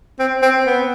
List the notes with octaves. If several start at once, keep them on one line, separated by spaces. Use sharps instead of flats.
C4
C4
B3